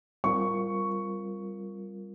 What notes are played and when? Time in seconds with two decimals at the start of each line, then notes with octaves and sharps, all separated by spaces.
0.24 G3 C4 F4 A#4 C#6